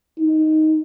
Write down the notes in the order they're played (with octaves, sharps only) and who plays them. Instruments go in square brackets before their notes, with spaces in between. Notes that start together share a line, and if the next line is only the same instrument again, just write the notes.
[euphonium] D#4